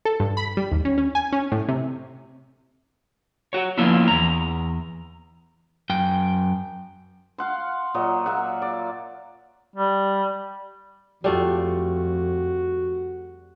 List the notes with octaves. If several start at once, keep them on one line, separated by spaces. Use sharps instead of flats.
A4
G2
B5
G3
D#2
C#4
C#4
G#5
C#4
A2
C3
F#4 C#5
F3 A#3 B3 C#4 D4 E4
E2 A#5
F#2 G5
F5 F#5 C6
A#2 F#3 D#5
A#3 E5 F#5
D5
G3
F2 G3 A3 F4 F#4